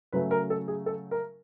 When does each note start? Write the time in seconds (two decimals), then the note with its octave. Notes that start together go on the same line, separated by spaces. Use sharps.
0.12 C#3 F#3 A3 B4
0.31 A#4
0.50 A4
0.68 G#4
0.86 A4
1.11 A#4